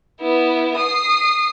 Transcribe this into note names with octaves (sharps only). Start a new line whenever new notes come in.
B3 E4
D#6 C7